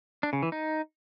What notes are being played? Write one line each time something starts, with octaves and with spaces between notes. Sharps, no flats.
D4
C#3
E3
D#4